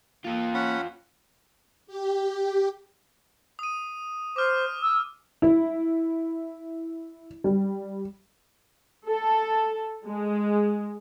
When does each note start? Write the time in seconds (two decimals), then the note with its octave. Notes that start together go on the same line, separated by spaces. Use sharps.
0.24 A#3 F4 A4
0.54 C#4 F#5 B5
1.87 G4
3.59 D#6 D#7
4.36 C5 D6 F6
4.82 E6
5.42 E4
7.44 G3
9.08 A4
10.06 G#3